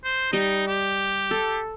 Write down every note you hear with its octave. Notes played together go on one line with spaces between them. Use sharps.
C5
G3 D#4 D#5
G4
A4